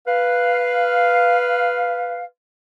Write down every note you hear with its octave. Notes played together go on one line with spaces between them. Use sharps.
B4 F5